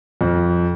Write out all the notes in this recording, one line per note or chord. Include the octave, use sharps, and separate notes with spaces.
F2